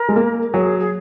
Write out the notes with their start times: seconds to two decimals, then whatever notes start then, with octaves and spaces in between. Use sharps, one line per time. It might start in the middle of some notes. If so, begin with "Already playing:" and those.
Already playing: A#4
0.09 G#3
0.16 A#3
0.54 F#3 G#4
0.79 G#4